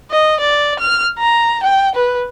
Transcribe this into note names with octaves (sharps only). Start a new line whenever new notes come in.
D#5
D5
F6
A#5
G5
B4